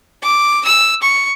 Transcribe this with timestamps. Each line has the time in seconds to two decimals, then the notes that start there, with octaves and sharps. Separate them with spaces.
0.22 D6
0.65 E6
1.02 C#6